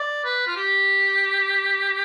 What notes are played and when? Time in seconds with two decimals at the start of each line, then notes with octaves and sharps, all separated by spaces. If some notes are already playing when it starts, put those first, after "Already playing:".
Already playing: D5
0.25 B4
0.47 F4
0.56 G4